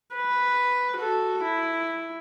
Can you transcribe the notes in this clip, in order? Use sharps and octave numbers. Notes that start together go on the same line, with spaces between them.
B4
F#4 A4
E4